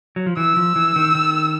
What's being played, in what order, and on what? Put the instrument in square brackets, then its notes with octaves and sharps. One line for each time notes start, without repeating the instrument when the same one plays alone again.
[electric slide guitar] F#3
F3
[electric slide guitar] E3 [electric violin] E6
[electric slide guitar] F3
E3
D#3
D#3